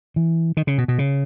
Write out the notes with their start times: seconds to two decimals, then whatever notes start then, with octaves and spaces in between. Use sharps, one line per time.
0.16 E3
0.57 D#3
0.67 C#3
0.78 B2
0.88 B2
0.99 C#3